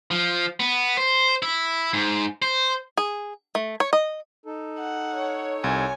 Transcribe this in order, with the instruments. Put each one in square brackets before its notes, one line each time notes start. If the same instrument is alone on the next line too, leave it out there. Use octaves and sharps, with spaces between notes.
[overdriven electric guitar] F3
B3
C5
E4
G#2
C5
[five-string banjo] G#4
A3
C#5
D#5
[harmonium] D#4 A4
[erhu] F#5
[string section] C#5
[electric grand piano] C2 [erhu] G#5